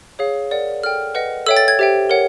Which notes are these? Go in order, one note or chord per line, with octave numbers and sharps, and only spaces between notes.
G#4 C#5 F5
A#4 D5 F#5
A4 D5 G5 F6
B4 D#5 F#5
A4 C#5 E5 G5 E6
A6
G#6
G4 C5 E5 G5
A#4 C#5 F#5